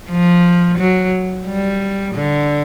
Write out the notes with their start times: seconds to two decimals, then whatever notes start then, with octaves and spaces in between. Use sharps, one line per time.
0.10 F3
0.78 F#3
1.46 G3
2.15 D3